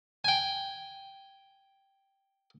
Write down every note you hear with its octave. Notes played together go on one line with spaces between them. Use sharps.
G5 G#5